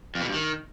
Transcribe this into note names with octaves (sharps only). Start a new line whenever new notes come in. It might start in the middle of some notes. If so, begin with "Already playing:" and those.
F2
B2
G2
D#3